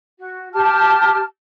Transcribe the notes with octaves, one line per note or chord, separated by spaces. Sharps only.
F#4
G4 A5 F6